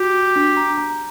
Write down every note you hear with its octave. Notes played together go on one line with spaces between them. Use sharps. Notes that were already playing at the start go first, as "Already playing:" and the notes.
Already playing: F#4 G4
F#4
D4
A#5
A#5